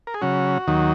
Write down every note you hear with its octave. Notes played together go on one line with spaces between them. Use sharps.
A#4
G#4
C#3 F#3 C#4 F#4
D#2 D#3 F#3